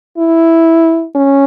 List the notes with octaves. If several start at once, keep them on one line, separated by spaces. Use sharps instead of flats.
E4
C#4